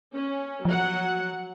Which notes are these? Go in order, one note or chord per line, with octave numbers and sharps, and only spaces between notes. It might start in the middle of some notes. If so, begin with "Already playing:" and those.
C#4
F3 F#3 F#5